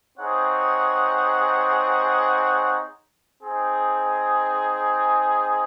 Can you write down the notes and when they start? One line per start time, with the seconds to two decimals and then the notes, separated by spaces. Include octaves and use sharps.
0.18 C4 D#4 G#4 C#5 F#5
3.43 C4 D#4 G#4